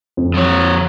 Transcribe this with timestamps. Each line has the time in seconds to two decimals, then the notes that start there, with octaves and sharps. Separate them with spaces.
0.17 F2
0.34 F3 C#5